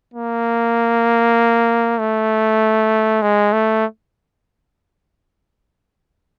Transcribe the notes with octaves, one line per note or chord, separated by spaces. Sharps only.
A#3
A3
G#3
A3